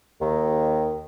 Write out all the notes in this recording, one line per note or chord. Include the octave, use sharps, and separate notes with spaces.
D#2 D#3